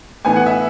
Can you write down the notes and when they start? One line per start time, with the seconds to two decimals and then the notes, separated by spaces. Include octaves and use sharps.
0.25 A2 E3 B3 G#5
0.36 F#5
0.46 E5